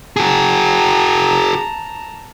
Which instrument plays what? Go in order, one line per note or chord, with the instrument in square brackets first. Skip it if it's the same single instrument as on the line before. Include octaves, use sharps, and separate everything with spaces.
[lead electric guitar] F#4 G#4 [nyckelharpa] A5 A#5